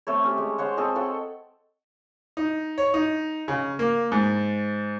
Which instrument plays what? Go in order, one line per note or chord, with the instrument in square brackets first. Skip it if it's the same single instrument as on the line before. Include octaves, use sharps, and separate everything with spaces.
[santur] A3 C4 C#5
C#4 G4
G#3
C5 C#5 F#5
C4 G#4 A4 D#5
A4 C#5 F#5 G5
[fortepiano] D#4
C#5
D#4
C#3
A#3
G#2